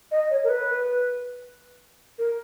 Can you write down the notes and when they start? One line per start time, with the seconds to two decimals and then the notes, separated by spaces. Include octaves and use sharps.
0.11 D#5
0.30 C#5
0.44 A#4
0.49 B4
2.18 A#4